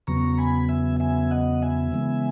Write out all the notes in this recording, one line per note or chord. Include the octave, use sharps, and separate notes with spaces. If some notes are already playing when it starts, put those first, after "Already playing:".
E2 C#3 F#3 B3 A#5 C#6
G#5 B5
E5 G#5
E5 G#5
D#5 F#5
E5 G#5
C#3 E3 G#3 B3